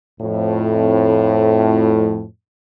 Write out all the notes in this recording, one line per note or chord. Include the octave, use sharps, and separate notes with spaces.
F2 A2